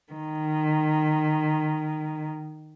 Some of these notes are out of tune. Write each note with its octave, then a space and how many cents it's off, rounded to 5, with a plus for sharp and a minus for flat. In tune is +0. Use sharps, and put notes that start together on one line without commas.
D#3 -15